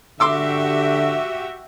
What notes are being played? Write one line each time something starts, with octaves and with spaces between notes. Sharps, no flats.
D3 F#4 G4 E5 C6 D6 E6